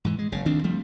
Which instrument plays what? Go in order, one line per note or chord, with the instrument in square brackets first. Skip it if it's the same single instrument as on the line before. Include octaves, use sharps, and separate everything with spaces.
[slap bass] G#2 E3
G#3
F#1 C#3
D2 D#3 C4 D4
F3 G3 A3